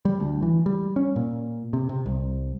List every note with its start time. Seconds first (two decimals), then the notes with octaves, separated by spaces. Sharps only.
0.05 G3
0.20 D2
0.42 E3
0.66 G3
0.96 C#4
1.16 A#2
1.73 C3
1.89 C3
2.06 C2